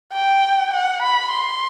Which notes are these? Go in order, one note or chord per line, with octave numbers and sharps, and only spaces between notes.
G5
F#5
B5
C6